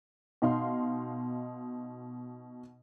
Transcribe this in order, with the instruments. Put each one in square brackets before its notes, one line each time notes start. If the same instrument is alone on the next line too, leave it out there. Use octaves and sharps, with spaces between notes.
[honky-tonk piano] B2 D#4 F5 C6